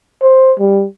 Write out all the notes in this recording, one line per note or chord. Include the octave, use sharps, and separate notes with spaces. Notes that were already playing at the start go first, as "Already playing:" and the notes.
C5
G3